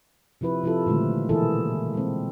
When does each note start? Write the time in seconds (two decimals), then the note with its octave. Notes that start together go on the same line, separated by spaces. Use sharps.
0.41 C3 F3 E4 B4
0.63 C3 F3 E4 F4 A4
0.86 A#2 D3 D#3 G#3 A3
1.29 B2 E3 A#3 E4 G#4 A4
1.94 G#3 C4